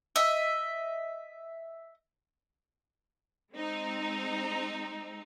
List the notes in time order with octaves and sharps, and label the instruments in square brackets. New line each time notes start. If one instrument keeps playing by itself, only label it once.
[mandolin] D#5 E5
[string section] G#3 C4 D#4